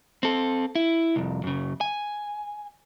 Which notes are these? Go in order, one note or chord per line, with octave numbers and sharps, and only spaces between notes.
C4 A4
E4
C2 F2
F#2 C#3
G#5